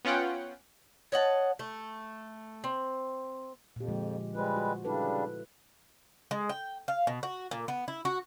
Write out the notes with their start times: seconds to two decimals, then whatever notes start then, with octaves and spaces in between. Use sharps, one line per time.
0.05 B3 C#4 F4 F#5 G5
1.12 C#5 D#5 F#5 A5
1.59 A3
2.64 C4
3.76 F2 A#2 G4
3.88 D3 F3 G#3
4.35 G3 G#3 F4 B4 C5
4.57 F#4
4.85 C#3 G3 D4 E4 A4 B4
6.31 G#3
6.49 G5
6.88 F5
7.07 B2
7.23 F#4
7.51 A#2
7.68 B3
7.88 E4
8.05 F#4